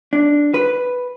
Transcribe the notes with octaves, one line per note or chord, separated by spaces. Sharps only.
D4
B4